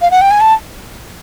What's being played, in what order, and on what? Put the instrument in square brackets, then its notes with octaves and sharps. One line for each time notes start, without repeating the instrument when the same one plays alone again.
[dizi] F5
F#5
G5
G#5
A5